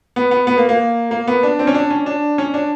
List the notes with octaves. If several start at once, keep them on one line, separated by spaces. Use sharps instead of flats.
B3
B3
B3
A#3
A#3
A#3
B3
D4
C4
C#4
D4
C#4
D4
C#4
D4